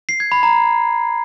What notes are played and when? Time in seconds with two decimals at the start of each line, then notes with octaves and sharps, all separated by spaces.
0.09 C7
0.20 G#6
0.32 B5
0.43 A#5